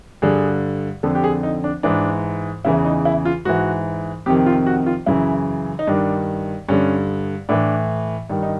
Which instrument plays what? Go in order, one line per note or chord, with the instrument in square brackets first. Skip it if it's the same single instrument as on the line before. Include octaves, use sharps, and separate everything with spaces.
[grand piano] G2 D3 G#4
F2 D3 A4
G4
G#4
D#4
D4
G#2 E3 D4
E2 C#3 E3 E4
D#4
E4
F4
G#2 E3 F#4
F2 C3 D#3 G4
F4
F#4
F4
F#2 C#3 E3 E4
D#4
G2 D#3 D4
G2 D3 C#4
A2 E3 D4
G2 D#3
D#4